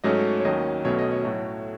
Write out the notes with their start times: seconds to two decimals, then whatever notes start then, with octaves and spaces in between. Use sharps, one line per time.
0.04 G#2 F#3 A3 C#4 D#5
0.40 C#5
0.45 D#2 D#3 F#3 C#4 D#5
0.84 B1 B2 F#3 A3 C#4 C#5
0.99 D#5
1.11 C#5
1.25 A2 F#3 A3